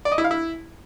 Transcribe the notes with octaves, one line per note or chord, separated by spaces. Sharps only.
D5
D#5
E4
F5
E4